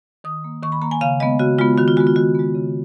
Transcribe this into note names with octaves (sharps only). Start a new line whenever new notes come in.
D#3 D#6
A#3
D#3 C#6
B5
A#3 A#5
G#5
C#3 F5
G#3 B3 D#5
C#3 F#4
G#3 B3 F4
D#3 F#4
F4
G#3 B3 F#4
F4
D#3 F#4
G#3 B3
C#3